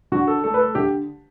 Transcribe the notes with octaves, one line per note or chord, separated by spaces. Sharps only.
D3 F#4
A4
A3 A4
B4
A4
D3 G4